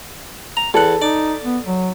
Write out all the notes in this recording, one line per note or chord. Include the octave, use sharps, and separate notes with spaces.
A#5
E2 A4 F#5
D#4 D5
B3
F#3